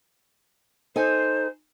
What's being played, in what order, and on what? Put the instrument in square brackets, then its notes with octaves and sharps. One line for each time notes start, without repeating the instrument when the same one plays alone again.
[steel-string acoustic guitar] D#4 A4 G#5 [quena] C5